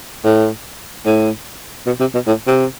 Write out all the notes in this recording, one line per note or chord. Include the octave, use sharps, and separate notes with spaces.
A2
A2
B2
C3
B2
A2
C3